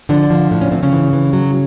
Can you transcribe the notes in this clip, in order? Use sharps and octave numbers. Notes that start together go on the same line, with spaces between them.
D3 F3 D4
F3
A2 D4
C#4
A2 C4
C#3 C#4
E3
E3
F#3